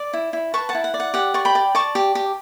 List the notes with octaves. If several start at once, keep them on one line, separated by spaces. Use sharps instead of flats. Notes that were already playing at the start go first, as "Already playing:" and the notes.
Already playing: D5
E4
E4
B4 A5 C#6
F#5 A5
E4
F#5
D5
F#5
G4 F#5
D5 C#6
G5 B5
D5
D5 A5 C#6
G4
G4